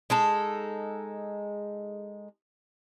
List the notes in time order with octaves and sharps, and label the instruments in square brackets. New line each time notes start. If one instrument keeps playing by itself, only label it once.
[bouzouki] G#3 D#4 A4